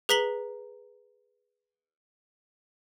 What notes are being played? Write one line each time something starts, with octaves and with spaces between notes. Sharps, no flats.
G#4 B4 A#5 B6 F#7 G7